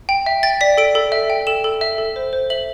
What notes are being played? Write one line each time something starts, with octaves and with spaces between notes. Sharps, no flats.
G5
E5
G5 A6
D5 B6
A4 D7
A4
E5
G5
A4 E7
A4
E5
A4
C5
C5
E5 F#7